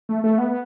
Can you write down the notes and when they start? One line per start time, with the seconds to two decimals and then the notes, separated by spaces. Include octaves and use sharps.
0.09 A3
0.24 A3
0.38 B3